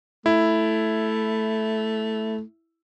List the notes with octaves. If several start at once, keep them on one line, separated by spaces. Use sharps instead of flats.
A3 E4